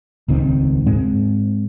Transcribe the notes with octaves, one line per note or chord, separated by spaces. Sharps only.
D#1 C#2 D#3 C4
G#2 G#3 C4